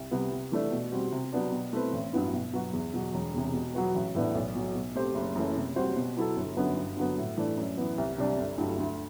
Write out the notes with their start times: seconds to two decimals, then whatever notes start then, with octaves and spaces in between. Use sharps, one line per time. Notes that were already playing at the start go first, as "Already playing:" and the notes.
Already playing: C2
0.11 C3 G3 B3
0.32 C3
0.52 E3 A3 D4 A4
0.72 B2
0.92 G3 C4 F#4
1.12 C3
1.33 F#3 B3 D4
1.52 B2
1.73 A3 C4 E4 B4
1.93 A1
2.13 G2 F#3 B3 E4
2.33 B2
2.53 F#3 B3 F#4
2.73 E2
2.94 B2 F#3
3.14 E1
3.34 E2 C3
3.54 B2
3.74 F#3 B3 F#4 B4
3.95 A1
4.15 A2 E3 B3 D4
4.35 B1
4.55 B2 F#3
4.75 B2
4.95 A3 C4 G4 C5
5.15 F#1
5.35 F#2 E3 A3
5.56 C3
5.76 G3 C4 F#4 C5
5.96 B2
6.17 F#3 B3 E4 A4
6.37 G1
6.57 F#2 D3 F#3 B3
6.77 G2
6.97 D3 F#3 B3
7.17 A2
7.38 E3 A3 D4
7.57 F#2
7.77 E3 B3
7.98 C2
8.18 C3 G3 D4
8.38 G1
8.58 G2 F#3 A3 E4
8.78 D2